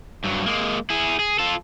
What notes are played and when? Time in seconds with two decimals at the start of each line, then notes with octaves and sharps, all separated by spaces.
0.24 G2 F#3
0.46 G#3 A#3
0.90 E4 G#4
1.19 G#4
1.39 F4 A4